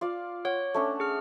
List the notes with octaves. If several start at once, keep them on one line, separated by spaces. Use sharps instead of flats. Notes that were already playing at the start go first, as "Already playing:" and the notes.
F4 D5 F5
C#5 F#5
A3 C#4 D4
G#4 F6